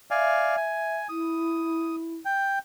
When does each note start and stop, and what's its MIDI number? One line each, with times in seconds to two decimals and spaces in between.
0.11 0.56 74
0.11 0.96 76
0.11 0.56 77
0.11 0.56 80
0.57 1.08 80
1.09 2.16 64
1.09 1.96 87
2.25 2.59 79